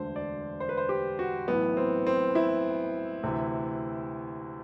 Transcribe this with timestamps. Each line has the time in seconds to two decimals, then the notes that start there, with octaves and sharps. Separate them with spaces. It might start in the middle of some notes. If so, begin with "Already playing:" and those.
Already playing: E1 D2 D3 C5
0.16 D5
0.60 C5
0.69 B4
0.77 C5
0.89 G4
1.19 F#4
1.48 B1 A2 E3 B3
1.77 C4
2.07 C4
2.35 E4
3.23 D2 C3 E3